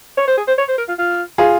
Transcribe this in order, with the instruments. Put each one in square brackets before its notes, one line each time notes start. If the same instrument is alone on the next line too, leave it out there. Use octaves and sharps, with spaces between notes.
[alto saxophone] C#5
C5
G#4
C5
C#5
C5
A#4
F4
F4
[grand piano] F4 G#4